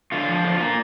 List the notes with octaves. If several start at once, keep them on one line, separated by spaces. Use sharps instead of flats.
D3 F4
F3
D3
A#3